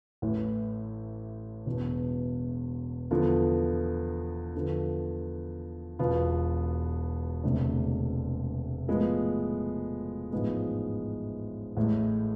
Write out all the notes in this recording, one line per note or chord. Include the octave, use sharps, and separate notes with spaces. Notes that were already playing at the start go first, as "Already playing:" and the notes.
A1 A2 E3
E1 E2 B2
E2 D3 F3 B3 F4
E2 D3 F3
E1 E2 B2 B3 F4
E1 D2 C3 G#3 D4
A2 F3 G#3 B3
A1 G#2 F3 G#3 B3
A1 A2 G#3